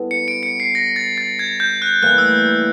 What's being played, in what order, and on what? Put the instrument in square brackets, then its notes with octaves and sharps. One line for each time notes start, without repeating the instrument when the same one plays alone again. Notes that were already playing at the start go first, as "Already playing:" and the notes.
Already playing: [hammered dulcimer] G3 B3 E4 A4
[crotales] C#7
D7
C#7
C7
A#6
A6
A6
G#6
G6
F#6
[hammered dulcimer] A2 E3 G3 A#3 [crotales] F#6
[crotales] E6